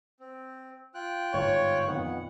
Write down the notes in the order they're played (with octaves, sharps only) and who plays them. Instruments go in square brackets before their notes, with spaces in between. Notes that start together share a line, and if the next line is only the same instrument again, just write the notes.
[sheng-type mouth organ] C4
F4 G5 F#6
[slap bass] G1 G#2 [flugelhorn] C#5
[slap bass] F2 A#2 D#3 [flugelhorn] B3 [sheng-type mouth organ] F#5